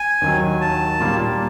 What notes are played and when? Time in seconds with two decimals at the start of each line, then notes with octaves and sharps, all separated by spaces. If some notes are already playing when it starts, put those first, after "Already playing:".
Already playing: G#5
0.22 D#2 D#3 F#3
0.61 A5
1.00 A#2 G3 A#3